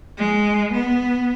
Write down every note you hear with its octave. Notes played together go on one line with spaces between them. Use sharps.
G#3
B3